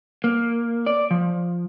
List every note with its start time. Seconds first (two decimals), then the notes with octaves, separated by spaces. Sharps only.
0.24 A#3
0.86 D5
1.11 F3